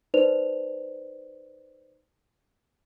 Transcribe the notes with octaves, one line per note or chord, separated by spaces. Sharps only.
D#4 B4 C5 D5 F7